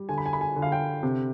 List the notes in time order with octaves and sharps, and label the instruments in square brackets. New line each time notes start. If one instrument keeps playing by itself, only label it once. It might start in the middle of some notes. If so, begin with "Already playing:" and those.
Already playing: [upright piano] G3
D3 G#5
B5
G#5
B5
G#5
D3
F5
G5
C3